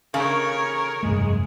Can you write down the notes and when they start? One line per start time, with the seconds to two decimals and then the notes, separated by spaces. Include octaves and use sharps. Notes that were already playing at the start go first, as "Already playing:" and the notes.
0.14 C#3 A#3 D#4 A4 A#4 C#5
1.03 F1 G2 G#3 A3